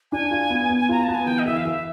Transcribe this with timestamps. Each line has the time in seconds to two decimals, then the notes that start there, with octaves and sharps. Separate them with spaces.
0.12 D4 G#5
0.31 F4
0.50 B3
0.69 B3
0.89 F4 A#5
1.03 B3 A5
1.15 G#5
1.26 E3 G5
1.39 D#5
1.46 E3 E5
1.57 F5
1.65 E3 E5